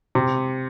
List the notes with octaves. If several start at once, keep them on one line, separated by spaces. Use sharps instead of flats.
C3